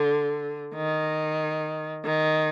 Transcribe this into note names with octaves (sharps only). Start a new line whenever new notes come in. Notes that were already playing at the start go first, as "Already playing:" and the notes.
Already playing: D3
D#3
D#3